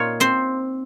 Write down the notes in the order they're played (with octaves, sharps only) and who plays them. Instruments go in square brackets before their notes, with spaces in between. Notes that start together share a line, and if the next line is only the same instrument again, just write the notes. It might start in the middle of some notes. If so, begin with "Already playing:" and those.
Already playing: [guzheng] A#2 D#4 F4 C#5
C4 C5